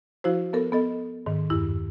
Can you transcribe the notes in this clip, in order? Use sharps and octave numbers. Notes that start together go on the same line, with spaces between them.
F3 E4 F#4 C5
B3 A4 A#4
B3 A4 D#5
G#2 D#3
E2 G2 E4